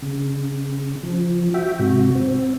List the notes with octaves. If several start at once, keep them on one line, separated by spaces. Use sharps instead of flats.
C#3
F3
F#4 E5 G5
G#2 C3 F#4
C4